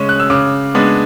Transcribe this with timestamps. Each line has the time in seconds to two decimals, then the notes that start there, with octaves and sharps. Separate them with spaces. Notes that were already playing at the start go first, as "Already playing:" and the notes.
Already playing: C#3 G#3 C#4 C#6
0.09 F#6
0.20 E6
0.30 C#3 D6
0.75 G#3 B3 D4